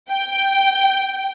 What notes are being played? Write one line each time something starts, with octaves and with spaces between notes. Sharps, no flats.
G5